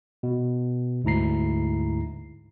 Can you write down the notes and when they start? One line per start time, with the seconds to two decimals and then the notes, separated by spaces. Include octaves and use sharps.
0.23 B2
1.04 D2 G#2 E4 A#5 C7